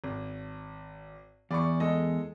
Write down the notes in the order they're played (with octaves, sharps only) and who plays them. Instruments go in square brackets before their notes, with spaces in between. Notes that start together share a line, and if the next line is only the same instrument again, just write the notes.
[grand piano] G#1
[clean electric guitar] E2 [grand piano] D5 B5 C#6
[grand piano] G#3 A4 D#5